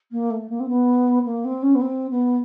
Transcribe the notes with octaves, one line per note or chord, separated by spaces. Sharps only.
A#3
A3
A#3
C4
B3
A#3
C4
C#4
B3
C4
B3